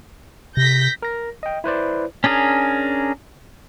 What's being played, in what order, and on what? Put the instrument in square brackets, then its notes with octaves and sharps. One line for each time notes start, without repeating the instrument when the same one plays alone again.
[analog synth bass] C3 [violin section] G6 A#6 B6
[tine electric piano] A#4 A#6
D#5 G5
E4 B4 C5 D5
[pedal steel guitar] C#4 D4 G#4 A#4